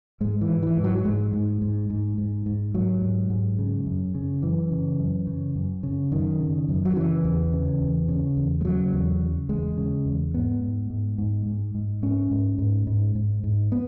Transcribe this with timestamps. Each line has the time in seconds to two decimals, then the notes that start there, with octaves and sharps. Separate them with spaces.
0.21 G#2 G#3
0.41 E3
0.49 G#2
0.63 E3
0.77 G#2
0.84 F#3
0.98 F#3
1.05 G#2 G#3
1.33 G#2
1.62 G#2
1.90 G#2
2.18 G#2
2.46 G#2
2.74 G#2 F#3
3.02 G#2
3.30 G#2
3.59 C#3
3.86 F#2
4.15 C#3
4.43 F#2 E3
4.72 C#3
5.00 F#2
5.27 C#3
5.55 F#2
5.83 C#3
6.11 F#2 D#3
6.40 C#3
6.68 F#2
6.85 F#3
6.96 C#3 E3
7.24 E2
7.53 C#3
7.81 E2
8.08 C#3
8.37 E2
8.61 G#3
8.65 C#3 F#3
8.93 E2
9.21 C#3
9.49 E2 G#3
9.77 C#3
10.06 E2
10.34 G#2 B3
10.62 G#2
10.90 G#2
11.18 G#2
11.46 G#2
11.75 G#2
12.02 G#2 C#4
12.31 G#2
12.58 G#2
12.87 G#2
13.15 G#2
13.43 G#2
13.72 B3